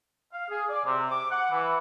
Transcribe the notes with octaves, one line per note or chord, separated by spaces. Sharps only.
F5
G#4
D5
C3
D6
F#5
E3